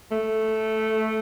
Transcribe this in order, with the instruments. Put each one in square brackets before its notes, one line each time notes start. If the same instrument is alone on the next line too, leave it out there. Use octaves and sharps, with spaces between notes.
[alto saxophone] A3